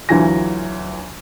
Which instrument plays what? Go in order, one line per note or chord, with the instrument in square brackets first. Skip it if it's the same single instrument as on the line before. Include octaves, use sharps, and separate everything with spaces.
[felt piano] D2 E3 F#3 F4 G#5 A#6